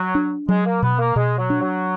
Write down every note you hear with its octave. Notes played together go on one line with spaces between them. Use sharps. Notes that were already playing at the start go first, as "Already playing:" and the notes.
Already playing: F#3
D4
F#3 G#3
A#3
B2 B3
A#3
B2 G#3
F#3
D4
F#3